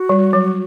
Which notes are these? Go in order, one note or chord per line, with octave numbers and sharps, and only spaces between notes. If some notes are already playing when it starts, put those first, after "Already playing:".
Already playing: F#4
G3
F#3